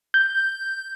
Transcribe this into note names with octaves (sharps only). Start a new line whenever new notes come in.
G6